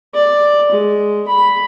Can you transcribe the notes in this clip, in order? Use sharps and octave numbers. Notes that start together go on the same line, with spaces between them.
D5
G#3
B5